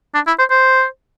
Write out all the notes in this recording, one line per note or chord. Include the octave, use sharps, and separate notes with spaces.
D4
E4
C5
C5